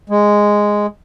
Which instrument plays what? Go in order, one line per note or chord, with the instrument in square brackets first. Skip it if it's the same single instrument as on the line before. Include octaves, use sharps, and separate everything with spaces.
[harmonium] G#3